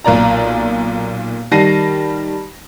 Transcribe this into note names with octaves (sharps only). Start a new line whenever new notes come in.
B1 A#2 D5 A#5
D#3 G3 A5 A#6 C7 D#7